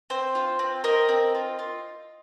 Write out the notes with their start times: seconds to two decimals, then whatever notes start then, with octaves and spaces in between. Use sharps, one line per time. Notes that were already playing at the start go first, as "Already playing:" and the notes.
0.10 C4 C5
0.35 F4
0.59 C4
0.84 C4 A#4 D#5
1.09 C4
1.35 F4
1.59 F4